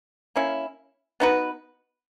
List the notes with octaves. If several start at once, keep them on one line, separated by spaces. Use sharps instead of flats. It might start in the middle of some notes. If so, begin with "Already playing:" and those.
A#3 C#4 E4
B3 D#4 F#4 B4